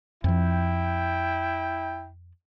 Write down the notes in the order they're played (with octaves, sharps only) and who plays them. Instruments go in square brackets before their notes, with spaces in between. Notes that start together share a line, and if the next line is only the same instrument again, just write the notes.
[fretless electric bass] F2 F3 [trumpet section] E4 G5